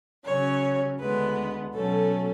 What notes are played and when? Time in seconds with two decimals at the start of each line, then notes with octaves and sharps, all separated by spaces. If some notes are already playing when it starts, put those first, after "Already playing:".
0.24 C#3 F#3 C#4 C#5
0.99 D2 D3 G#3 B3 B4
1.74 B2 F#3 A3 C#4 A4